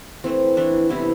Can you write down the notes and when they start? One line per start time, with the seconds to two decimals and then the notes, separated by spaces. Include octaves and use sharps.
0.24 E3 A3 C4
0.57 E3 A3 D4
0.89 C3 G3 B3 E4